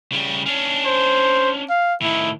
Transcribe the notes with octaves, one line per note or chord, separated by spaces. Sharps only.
C#3 G3
C#4 D4
C5
F5
A2 D#3 E4